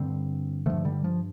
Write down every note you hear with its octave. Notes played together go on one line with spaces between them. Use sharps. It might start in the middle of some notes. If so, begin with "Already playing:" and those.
Already playing: G2 D3 G3 C4
G2 D3 F3 A3
D3 G3
F3